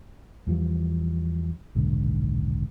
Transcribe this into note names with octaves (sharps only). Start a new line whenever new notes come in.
E2 E3 F3 G3
D#1 B1 G#2 D3